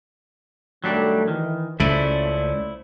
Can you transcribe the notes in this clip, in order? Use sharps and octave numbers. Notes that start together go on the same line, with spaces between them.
F#2 D#3 F#3 G3 A3 D4
D#3 E3
C#2 C#3 A3 C#4 E4 C5 D5